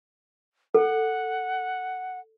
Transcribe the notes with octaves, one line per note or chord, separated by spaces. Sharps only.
A4 F#5